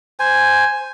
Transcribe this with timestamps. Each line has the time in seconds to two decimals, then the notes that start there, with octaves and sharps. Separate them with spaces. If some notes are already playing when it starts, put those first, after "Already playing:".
0.20 C5 G#5